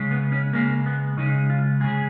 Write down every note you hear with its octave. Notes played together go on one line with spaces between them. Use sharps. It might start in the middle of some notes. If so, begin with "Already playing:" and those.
Already playing: C#3 G#3
B3
C#4
C#3 G#3 A#3
B3
C#3 G#3 D#4
F4
C#3 G#3 G#4